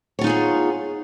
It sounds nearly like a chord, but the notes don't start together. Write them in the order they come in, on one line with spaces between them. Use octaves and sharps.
C#5 F4 D#4 G#4 B3